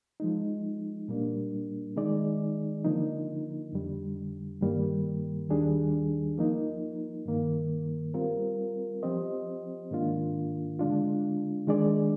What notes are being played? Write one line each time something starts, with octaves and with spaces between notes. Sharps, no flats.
F3 G#3 D#4
A#2 G3 A#3 D4
D#3 G#3 D#4 G#4 D5
D3 F3 A#3 D#4
F2 D3 G3
G2 D#3 G3 A#3
D#2 D#3 G3 D4 G#4
F3 A#3 D#4
G2 D#3 A#3
G3 C4 F4 A#4
F3 C4 G4 C5 D#5
G#2 D#3 A#3 D4 F4
D3 G#3 D4 F4
D#3 G#3 D4 G#4 D5